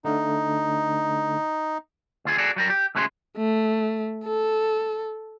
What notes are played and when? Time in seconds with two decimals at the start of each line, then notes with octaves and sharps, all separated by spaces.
0.05 D3 A3 D4 D#4
2.25 D2 F4 G#4
2.38 F#4 G#4 A4 D5
2.56 F#3 G3 A#4
2.70 G4
2.95 C#2 A3 C#4 F#4 G#4 C6
3.37 A3
4.25 A4